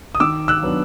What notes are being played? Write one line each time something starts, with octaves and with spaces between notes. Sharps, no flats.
D#6
D#3 D6 E6
E6 F#6
F#3 B3 D4